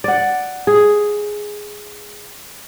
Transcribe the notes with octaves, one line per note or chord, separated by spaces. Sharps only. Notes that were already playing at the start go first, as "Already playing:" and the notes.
D5 F#5
G#4